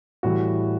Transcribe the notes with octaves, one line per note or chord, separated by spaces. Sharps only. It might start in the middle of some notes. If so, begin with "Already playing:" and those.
A2 E3 G3 F#4